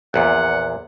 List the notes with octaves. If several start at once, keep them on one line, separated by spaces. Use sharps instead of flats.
A#1 E2 A#2 F#5